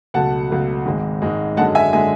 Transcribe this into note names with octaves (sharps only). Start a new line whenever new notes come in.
C#2 B2 F#3 A3 F#5 A5
C#2 B2 F#3 A3
G#1 G#2 G#3
G#1 G#2 G#3
F#2 D3 G#3 F#5 A5
E5 G#5
D3 G#3 E5 G#5